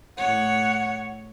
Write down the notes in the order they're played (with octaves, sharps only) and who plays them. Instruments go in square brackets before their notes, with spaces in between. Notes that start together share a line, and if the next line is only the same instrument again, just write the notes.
[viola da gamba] A2 C#5 [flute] F#5